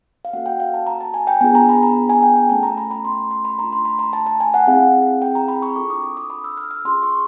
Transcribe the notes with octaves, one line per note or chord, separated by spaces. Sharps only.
F5
A#3 C#4 F#4 A4 F#5
G5
F5
A5
A#5
A5
G#5
G5
B3 D4 F4 G#4 G#5
A#5
B5
A#5
G#5
G5
G5
A3 C#4 F4 A4 A5
A#5
B5
B5
C6
C6
B5
A3 D4 F4 A#5
C6
B5
A#5
A5
A5
G#5
F#5
C4 E4 G#4 F5
G5
A#5
B5
C#6
D4 F4 A4 D6
D#6
D6
D#6
B5
E6
F6
E6
C#4 F4 G#4 C6
C#6